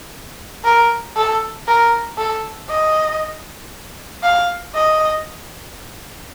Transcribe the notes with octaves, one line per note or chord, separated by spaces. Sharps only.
A#4
A4
A#4
A4
D#5
F5
D#5